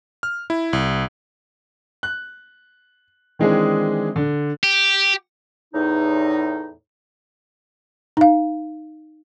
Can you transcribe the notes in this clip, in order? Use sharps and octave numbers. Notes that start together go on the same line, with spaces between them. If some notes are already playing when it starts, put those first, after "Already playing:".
F6
E4
C2
F#6
D#3 E3 G#3 C4 D4 G#4
D3
G4
E2 A2 D#4
D#4 F5